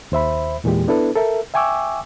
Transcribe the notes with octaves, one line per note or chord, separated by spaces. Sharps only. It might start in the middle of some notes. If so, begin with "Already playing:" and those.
D#2 C5 E5 B5
E2 A#2 E3 G#3 G4
B3 D4 E4 A4 B4
A4 A#4 E5
E5 G5 G#5 C#6 D6 E6